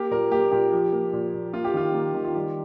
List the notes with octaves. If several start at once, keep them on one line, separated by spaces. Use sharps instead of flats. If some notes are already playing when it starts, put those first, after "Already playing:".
Already playing: A#3 G4
A#2 A#4
A#3 G4
A#2 G4
F3
A#3
A#2
A#2
A#3 F4
G4
D#3 F4
A#3
D#3
F4
G3 G4